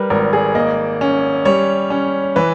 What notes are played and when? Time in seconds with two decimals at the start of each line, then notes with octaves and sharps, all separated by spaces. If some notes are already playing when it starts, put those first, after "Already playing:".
Already playing: G3 A#4 B4
0.10 G#1 A#4
0.33 G#4
0.55 A#3 D#5
1.01 C#4
1.45 G3 C#5
1.90 C#4
2.36 E3 B4